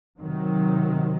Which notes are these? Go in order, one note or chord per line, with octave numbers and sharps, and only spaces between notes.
C3 D#3 F#3